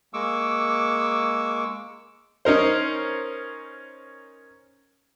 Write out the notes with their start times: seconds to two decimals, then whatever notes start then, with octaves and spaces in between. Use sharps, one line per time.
0.14 G#3 A#3 C#6 D6 E6
2.45 C#4 D#4 A#4 C5